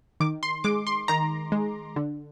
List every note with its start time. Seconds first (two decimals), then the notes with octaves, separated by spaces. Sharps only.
0.20 D#3 D6
0.43 C6
0.64 G#3 D6
0.87 C6
1.08 D#3 A#5
1.52 G#3
1.96 D3